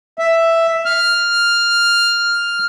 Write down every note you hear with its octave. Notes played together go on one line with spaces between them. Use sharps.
E5
F6